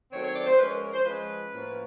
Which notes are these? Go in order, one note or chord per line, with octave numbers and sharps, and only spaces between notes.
D#3 F#3 A3 C4 C#5
C#5
D5
C5
F3 G#3 C#4 B4
A#4
A#4
C5
F3 G#3 C#4 B4
A2 F3 A#3 C#4